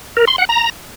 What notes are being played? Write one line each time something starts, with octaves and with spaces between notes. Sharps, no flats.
A#4
C6
F#5
A#5